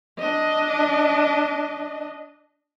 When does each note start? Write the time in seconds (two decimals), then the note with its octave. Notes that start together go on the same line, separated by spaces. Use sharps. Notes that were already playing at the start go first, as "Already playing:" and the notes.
0.19 D4 D#5